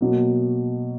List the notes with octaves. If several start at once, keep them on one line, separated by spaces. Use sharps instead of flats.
B2 F#3 A#3